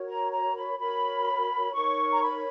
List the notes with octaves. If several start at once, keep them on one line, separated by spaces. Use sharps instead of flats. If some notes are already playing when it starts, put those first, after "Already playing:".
Already playing: F#4 A#4 C#5
A#5
A#5
B5
F#4 A#4 C#5 B5
D#4 A#4 C#5 C#6
A#5
B5